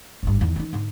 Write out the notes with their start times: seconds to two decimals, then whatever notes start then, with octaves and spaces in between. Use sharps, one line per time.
0.23 G#1 G2
0.41 E2 D#3
0.56 E3 D#4
0.73 G#2 D3